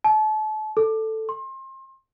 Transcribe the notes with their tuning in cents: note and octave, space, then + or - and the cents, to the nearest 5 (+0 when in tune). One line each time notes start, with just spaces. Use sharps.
A5 -35
A4 +5
C6 +30